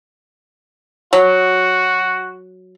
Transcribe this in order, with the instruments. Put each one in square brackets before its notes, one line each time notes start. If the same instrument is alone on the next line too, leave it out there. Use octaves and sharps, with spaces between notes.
[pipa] F#3 [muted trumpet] F#4